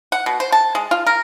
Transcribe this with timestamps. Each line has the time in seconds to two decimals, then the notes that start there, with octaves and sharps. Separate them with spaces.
0.12 F#5
0.26 B2
0.40 C5
0.52 A5
0.75 G#3
0.91 F4
1.07 A#4